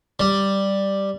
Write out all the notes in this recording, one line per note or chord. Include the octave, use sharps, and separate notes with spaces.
G3